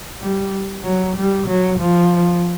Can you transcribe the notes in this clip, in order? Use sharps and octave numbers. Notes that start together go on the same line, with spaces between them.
G3
F#3
G3
F#3
F3